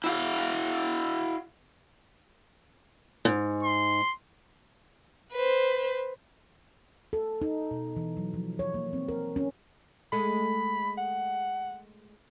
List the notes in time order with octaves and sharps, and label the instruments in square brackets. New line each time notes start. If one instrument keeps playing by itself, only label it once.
[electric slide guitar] E4 F#4 F5
[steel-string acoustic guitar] G#2
[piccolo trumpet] C6
[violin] B4 C5
[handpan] A4
D#4
B2
E3
F#3
F3
C#5
A#3
C4
A#4
C#4
[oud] G#3 A3 [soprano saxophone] B5
[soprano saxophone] F#5